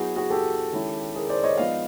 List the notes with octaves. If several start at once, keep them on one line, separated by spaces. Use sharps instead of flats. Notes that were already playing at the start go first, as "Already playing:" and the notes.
Already playing: F#3 B3 E4 F#4 G#4
F#4 G#4
G4 A4
D#3 G#3 C#4 E4
G#4 A#4
C5 D5
C#5 D#5
F3 G#3 B3 D#4 D#5 F5